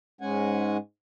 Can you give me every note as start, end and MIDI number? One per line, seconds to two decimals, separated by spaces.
0.21 0.77 44
0.21 0.77 56
0.21 0.77 61
0.21 0.77 78
0.21 0.77 80